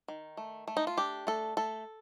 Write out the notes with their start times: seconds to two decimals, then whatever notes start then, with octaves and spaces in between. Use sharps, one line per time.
0.08 D#3
0.37 A3
0.68 A3
0.77 D#4
0.87 F4
0.97 D4 G4
1.27 A3 A4
1.57 A3 A4